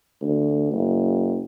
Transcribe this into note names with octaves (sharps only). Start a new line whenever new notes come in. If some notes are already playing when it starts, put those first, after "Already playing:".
D2
F#1